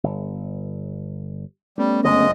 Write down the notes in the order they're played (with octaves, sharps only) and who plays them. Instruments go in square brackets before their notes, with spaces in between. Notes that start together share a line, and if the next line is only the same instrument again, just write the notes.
[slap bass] G1
[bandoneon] G3 [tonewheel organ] A3 B3 C#4
[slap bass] F#1 F2 D3 [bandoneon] G#3 D#5